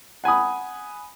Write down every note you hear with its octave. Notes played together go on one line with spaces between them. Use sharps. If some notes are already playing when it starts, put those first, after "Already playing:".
F#5 G#5 B5 D#6